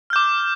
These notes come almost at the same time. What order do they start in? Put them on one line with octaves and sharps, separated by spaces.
F6 G6 D6